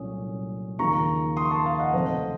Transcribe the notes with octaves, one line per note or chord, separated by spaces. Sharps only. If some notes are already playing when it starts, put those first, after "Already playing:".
Already playing: C2 A#2 F#3 A3 C#4 D#6
D#2 C#3 F3 A#3 D#4 A#5 C#6
C6 D#6
C#6
A5 C6
F5 A5
D#5 F#5
F1 F2 C#3 A3 C4 C5 D#5